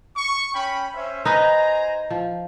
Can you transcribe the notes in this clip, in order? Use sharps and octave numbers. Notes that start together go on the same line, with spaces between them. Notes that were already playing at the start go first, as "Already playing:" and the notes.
C#6
C#4 G5 B5
C#4 C5 E5
D#4 B4 C5 D#5 G#5 A#5
F3